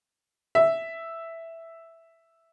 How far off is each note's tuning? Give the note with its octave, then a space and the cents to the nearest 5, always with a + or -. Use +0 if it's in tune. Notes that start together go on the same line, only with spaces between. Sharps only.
E5 +0